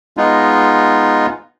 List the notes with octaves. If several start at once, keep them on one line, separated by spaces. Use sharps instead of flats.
G#3 B3 D#4 F4